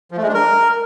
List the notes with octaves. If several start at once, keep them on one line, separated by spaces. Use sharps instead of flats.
F3
A3
G#3
D4
A#4